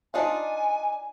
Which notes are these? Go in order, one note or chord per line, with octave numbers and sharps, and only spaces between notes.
D4 D#4 F4 G#5